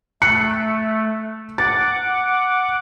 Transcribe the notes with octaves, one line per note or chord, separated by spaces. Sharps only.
A3 F#6 C#7
F#5 D6 A6